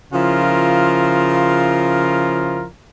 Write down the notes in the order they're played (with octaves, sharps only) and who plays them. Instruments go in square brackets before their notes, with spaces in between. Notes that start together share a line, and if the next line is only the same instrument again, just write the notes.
[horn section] C#3 F3 E4 F4 A#4